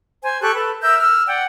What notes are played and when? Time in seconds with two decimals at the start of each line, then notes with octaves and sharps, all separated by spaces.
0.23 C5 G#5
0.41 G4 A4 C#6 F#6
0.55 A4 B4
0.82 A#4 E5 E6 G6
0.99 E6 F6
1.27 D5 F#5 G5